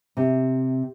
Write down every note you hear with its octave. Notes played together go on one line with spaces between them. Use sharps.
C3